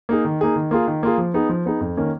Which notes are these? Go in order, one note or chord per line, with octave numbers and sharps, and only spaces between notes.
A#3 D#4 G#4
D#3
A#3 D#4 G#4
D#3
A#3 F4 G#4
D#3
A#3 F4 G#4
F3
B3 D#4 G#4
F3
B3 D#4 G#4
F2
D#3 A#3 C#4